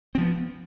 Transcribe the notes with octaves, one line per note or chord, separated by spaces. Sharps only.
F3 B3 C4